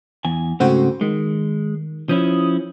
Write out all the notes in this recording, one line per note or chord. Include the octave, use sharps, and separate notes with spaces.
E2 G#5
G#2 C#3 A3 C4 F#4 C5
D#3 G#3
F3 C#4 E4 D#6